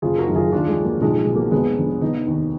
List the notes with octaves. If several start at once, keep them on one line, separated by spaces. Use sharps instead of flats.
F#1 F4 G#4
F#4 A#4
F#2 D#3
F4 G#4
D#2 D4 F4
F3 G#3
D3
F#3 A#3
B1 F3 G#3
B2 G#3
F#3 A#3
F1 G#3 B3
F2 D3
F1 B3 D#4
D#2 D#3